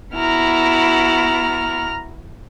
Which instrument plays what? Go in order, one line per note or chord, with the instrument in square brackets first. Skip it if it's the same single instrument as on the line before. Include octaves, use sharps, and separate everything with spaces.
[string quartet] B3 E4 F#4 [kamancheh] A#5 F6